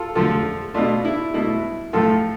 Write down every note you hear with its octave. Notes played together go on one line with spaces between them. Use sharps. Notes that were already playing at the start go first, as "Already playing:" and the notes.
Already playing: F4 A4
D3 F3 A3 F4 A4
B2 A3 D4 F4
E4
B2 A3 E4
A2 F3 A3 F4 A4